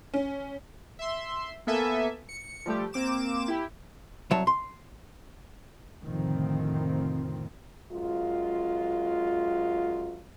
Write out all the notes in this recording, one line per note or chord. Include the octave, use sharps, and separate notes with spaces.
C#4
E5 C6
A#3 B3 A4 E5 G#5
C#7
F3 G3 A3 G4
A#3 C4 D6 E7
E4 G4
C2 F#3 C#5 A5
C6
F1 A2 D3 D#3 F3 C4
F#2 G#3 F4